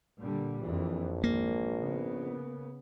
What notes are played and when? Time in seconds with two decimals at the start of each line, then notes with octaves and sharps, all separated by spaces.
0.20 A#2 D3 G3
0.62 A#1 F2 E3
1.24 G#1 A#3
1.80 C#3 B3